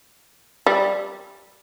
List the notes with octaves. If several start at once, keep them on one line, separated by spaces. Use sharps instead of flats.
G3